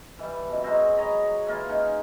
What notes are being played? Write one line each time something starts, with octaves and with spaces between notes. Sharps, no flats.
E3 G3
F#2 B2
F#3 G#3 C4
C#5 D#5 A#5 B5
E3 A#3 F4
C#4 D#4 G#4